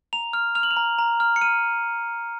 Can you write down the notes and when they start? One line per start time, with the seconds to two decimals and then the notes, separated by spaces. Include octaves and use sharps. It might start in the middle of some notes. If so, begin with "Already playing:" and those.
0.13 A#5 F7
0.33 F6
0.55 F6 F7
0.63 F#7
0.71 F7
0.77 A#5
0.99 A#5
1.20 F6
1.36 C#7
1.41 F6 D#7